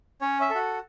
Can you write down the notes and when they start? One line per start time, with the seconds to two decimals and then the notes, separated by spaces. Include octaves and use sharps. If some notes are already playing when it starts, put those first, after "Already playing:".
0.21 C#4 C#5
0.41 E5
0.50 F#4 A4